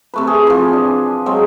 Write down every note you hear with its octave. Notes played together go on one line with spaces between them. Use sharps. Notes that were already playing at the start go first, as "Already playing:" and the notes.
C3 A3 B4
G#4
E3 F3
D4
F#3 G#3 C4